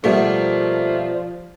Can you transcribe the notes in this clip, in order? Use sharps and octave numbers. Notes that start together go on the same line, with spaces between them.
B2 F3 G3 A3 A#3